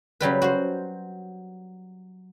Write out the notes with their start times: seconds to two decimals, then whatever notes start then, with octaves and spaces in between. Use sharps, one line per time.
0.21 C#3 F#3 G3 B4
0.42 F#4 C5